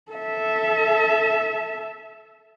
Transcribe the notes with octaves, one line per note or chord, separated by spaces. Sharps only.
A4 E5